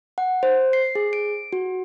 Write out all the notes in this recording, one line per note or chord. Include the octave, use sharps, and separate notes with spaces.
F#5
C5
C7
G#4
D7
F#4